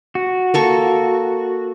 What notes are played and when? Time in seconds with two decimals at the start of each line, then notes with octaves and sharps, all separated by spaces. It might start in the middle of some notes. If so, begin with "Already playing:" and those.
0.15 F#4
0.54 A#3 A4 C#6